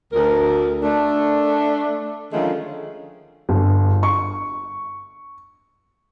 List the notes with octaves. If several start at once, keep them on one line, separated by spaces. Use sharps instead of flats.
D2 A#4
A3 D4
D3 D#3 F3 G#3 A3 C#4
G1
C#6